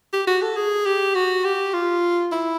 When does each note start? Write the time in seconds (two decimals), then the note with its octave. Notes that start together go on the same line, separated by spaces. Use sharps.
0.13 G4
0.27 F#4
0.42 A4
0.57 G#4
0.86 G4
1.15 F#4
1.45 G4
1.74 F4
2.32 E4